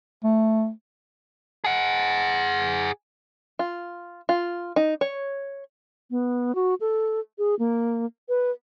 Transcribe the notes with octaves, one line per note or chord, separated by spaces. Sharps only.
A3
G#4 F#5
F4
F4
D#4
C#5
B3
F#4
A4
G#4
A#3
B4